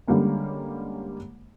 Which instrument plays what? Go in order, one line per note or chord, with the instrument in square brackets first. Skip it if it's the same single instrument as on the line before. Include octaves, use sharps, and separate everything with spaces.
[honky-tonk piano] D3 G3 G#3 A#3 C#4